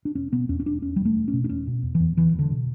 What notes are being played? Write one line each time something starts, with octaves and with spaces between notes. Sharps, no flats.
D4
E1 C#4
B2 B3
E2 C#4
C#4
E1 D4
E2 C#4
G3
E1
A3
E1
C#4
B2
D4
E1 C#4
B2
E2
E3
E2
E2 E3
E1
D3
B2